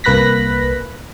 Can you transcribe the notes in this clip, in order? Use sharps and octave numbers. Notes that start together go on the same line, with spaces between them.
C2 A#3 B4 F#6 A#6 B6